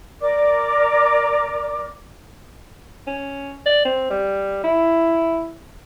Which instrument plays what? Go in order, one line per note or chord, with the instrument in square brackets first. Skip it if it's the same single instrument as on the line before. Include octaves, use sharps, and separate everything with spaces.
[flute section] A#4 D5 D6
[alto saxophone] C#4
D5
C4
G3
E4